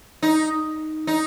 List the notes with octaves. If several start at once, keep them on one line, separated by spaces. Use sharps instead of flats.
D#4
D#4